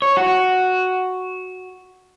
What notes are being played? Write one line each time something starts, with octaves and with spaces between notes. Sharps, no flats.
C#5
F#4